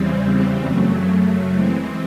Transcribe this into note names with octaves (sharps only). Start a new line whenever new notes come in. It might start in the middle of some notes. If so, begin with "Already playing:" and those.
Already playing: E2 C#3 E3 G3 C4
F#2 C#3 F#3 A3
E3 G#3 C4